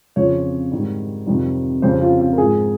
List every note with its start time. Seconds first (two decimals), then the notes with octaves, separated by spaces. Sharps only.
0.16 F2 C#3 F3 C#5
0.72 G#2 D#3 G3
1.27 F2 C3 D#3 G3
1.82 F2 C#3 G3 C5
2.01 F4
2.20 F4
2.33 A#4
2.38 G#2 F3 G#4